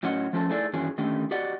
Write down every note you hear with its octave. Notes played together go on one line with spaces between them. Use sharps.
A2 F#3 C#4 D#5 F#5
F3 A3 C#4 F4 C5 A5
A3 D#4 E4 G#4 A4 D5
G2 D#3 E3 C#4 F#4 G#4
D3 D#3 A3 C#4 D#4 G4
F#4 G4 D5 D#5 F#5